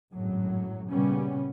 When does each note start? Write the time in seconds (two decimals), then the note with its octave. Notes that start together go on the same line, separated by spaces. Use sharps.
0.12 G#1 F#2 A2 F#3
0.89 A#2 C#3 G3 B3 C#4